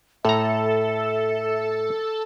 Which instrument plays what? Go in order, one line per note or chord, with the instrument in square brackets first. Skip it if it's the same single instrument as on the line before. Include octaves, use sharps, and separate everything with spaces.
[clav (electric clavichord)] A2 A#5 [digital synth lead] A4 [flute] E5